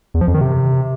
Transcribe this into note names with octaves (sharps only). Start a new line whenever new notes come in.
E2
F3
F2
D#3
C3